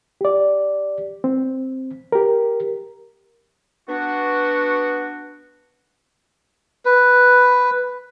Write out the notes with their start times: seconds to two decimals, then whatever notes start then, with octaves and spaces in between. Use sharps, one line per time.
0.21 G4 D5
1.24 C4
2.12 G4 A#4
3.89 B3 D4 F#4
6.85 B4